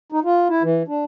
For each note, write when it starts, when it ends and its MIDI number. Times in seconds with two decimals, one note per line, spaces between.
0.12 0.20 63
0.25 0.48 65
0.49 0.63 64
0.63 0.83 52
0.88 1.04 62